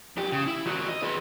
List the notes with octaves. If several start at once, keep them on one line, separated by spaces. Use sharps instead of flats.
F#2 G4
C#3
E4
D#3 F#4
D#5
G#4 B4